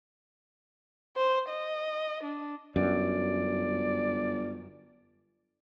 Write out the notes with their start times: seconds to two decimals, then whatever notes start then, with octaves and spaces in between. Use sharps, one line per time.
1.17 C5
1.49 D#5
2.24 D4
2.76 G1 F#2 D5